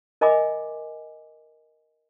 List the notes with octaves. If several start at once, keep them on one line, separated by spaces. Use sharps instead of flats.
A#4 D#5 E5 G#5 B5 D6